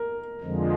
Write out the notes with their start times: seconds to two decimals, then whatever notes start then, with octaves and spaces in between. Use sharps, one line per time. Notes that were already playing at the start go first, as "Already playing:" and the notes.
Already playing: A#4
0.41 F2 D3 F3 G#3